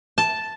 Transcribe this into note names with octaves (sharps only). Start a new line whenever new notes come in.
A5